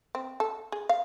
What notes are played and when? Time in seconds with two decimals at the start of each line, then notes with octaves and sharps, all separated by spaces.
0.15 C4
0.40 A4
0.72 G#4
0.89 F5